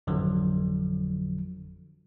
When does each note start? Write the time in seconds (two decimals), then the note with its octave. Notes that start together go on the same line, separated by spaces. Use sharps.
0.07 G#1 F2 D3 F3 F#3